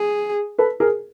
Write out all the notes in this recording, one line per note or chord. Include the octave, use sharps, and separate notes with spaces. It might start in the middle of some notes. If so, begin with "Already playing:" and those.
Already playing: G#4
A4 B4
G#4 A#4